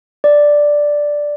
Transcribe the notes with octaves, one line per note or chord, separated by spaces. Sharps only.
D5